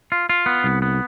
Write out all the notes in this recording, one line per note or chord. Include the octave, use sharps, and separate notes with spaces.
F4
F4
B3
C2
B3